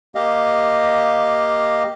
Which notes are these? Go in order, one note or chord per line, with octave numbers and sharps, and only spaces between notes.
A#3 G4 D#5 F5